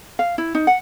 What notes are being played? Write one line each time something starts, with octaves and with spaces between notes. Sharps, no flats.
F5
E4
D#4
F#5